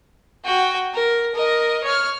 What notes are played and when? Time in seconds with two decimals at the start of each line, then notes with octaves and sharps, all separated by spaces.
0.45 F#4 G5
0.94 A#4
1.34 A#4 D#5
1.84 C#5 F6